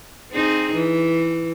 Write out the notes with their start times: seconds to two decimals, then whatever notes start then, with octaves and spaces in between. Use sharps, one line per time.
0.32 C4 D#4 G#4
0.74 E3